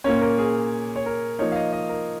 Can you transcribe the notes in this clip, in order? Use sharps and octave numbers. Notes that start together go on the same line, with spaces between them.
A#2 A#3 C#4 C#5
A#4
G#4
C#5
A#4
F3 A#3 D#4 C#5
F5
D#5
D#5
A#4